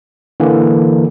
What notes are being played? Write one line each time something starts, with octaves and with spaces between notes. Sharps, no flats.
D3 E3 A#3